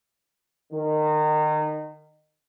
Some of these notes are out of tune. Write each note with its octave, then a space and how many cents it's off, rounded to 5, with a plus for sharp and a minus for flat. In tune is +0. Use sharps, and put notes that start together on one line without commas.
D#3 -25